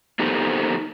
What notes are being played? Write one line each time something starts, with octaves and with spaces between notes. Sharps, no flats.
A#3 B3 D#4 G4 A4 C5